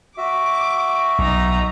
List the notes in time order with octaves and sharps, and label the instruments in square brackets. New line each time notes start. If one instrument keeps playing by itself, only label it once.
[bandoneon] F#4 E5 [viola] D6
[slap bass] B1 [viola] D#4 A#5